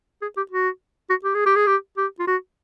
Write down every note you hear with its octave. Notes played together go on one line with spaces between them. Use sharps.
G#4
G4
F#4
F#4
G4
G#4
G4
G#4
G4
G4
F4
F#4